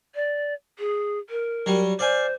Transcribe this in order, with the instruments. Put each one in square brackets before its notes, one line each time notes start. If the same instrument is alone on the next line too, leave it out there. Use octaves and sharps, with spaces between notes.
[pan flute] D5
G#4
A#4
[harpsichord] F#3 G3
[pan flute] C5 [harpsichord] D5 F5 G#5